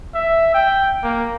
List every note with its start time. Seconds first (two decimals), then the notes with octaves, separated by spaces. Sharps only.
0.15 E5
0.55 G5
1.03 A#3